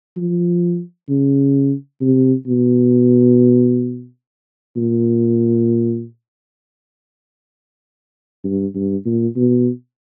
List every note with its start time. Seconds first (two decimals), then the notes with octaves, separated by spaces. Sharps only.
0.17 F3
1.09 C#3
2.01 C3
2.47 B2
4.77 A#2
8.44 G2
8.75 G2
9.06 A#2
9.36 B2